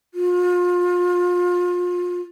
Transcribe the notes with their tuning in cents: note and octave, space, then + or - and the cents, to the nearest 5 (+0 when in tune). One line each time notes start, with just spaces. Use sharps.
F4 +30